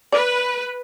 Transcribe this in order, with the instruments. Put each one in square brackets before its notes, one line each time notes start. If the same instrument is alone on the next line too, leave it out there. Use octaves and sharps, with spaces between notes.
[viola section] B4 [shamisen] D5